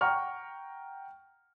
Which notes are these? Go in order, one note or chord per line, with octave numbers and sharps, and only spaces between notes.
F#5 G5 A#5 C#6 F6